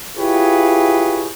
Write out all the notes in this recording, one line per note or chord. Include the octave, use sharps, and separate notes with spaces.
E4 F4 G4 G#4 B4 C#5